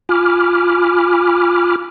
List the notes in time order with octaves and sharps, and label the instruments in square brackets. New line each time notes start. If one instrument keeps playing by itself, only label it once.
[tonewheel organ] F4 G#5 B5 D6 F6